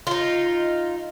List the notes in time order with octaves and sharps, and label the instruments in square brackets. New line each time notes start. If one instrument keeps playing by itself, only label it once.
[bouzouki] D#4 F4